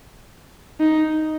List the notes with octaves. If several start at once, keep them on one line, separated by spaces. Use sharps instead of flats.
D#4